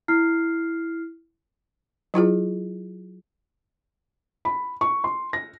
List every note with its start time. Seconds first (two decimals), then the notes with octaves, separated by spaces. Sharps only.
0.08 E4 F6 C7
2.14 F#3 E4 F4 G#4
4.45 B5
4.81 C#6
5.04 C6
5.33 A#6